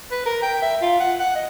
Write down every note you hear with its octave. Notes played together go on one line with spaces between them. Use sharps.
B4
A#4
G5
E5
F4
F#5
F#5
D#5